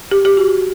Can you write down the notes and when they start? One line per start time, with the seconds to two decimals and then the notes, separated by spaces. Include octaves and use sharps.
0.11 G4
0.25 G4
0.37 F#4